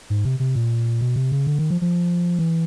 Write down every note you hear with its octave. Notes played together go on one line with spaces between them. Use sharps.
G#2
C3
C3
A#2
B2
C3
C#3
D3
D#3
F3
F3
E3